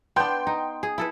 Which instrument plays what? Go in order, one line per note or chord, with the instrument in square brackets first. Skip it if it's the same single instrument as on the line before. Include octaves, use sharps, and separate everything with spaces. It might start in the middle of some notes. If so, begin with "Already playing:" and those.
[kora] B3 D4 [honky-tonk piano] G5 C6 G6
[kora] D#4
G#4
E4 A4 B4